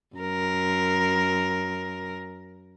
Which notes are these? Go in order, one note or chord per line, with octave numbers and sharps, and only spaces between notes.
F#2 A#4